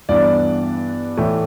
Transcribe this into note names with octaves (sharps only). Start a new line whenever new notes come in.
G2 E3 B3 D4 D5
A2 E3 A3